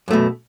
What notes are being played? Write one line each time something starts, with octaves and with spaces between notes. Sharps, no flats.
F#2 B2 A3